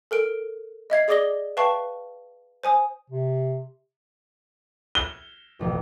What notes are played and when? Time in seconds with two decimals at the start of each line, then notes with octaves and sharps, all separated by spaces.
0.11 A4 A#4 D7
0.90 D#5 E5 G#6 C7
1.08 G#4 D5 D6 D#6 A#6 G7
1.57 B4 E5 F5 G5 A5 C#6
2.63 C5 G#5 D#6
3.10 C3
4.95 G7
5.59 E1 A1 F2